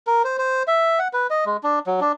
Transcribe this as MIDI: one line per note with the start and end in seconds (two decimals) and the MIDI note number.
0.07 0.22 70
0.24 0.37 72
0.38 0.63 72
0.68 0.99 76
0.99 1.08 78
1.13 1.27 71
1.30 1.44 75
1.46 1.57 56
1.63 1.79 62
1.87 2.00 54
2.01 2.12 62